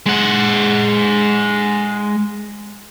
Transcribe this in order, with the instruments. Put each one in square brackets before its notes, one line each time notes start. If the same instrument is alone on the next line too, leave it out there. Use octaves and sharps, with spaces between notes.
[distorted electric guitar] G#3 F#5